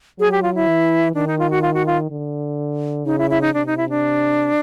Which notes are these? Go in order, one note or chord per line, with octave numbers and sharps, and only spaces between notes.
F#3 G#4
G4
F4
E4
E3
D#3 D4
D#4
F4
F#4
F4
F#4
F4
D3
C#3 D#4
E4
E4
D#4
C3 D4
D#4
E4
D4